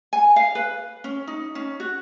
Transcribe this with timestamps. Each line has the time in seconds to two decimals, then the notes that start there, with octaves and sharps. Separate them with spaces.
0.13 G#5
0.36 F5
0.55 B4
1.04 C#4
1.27 D#4
1.55 C#4
1.80 F#4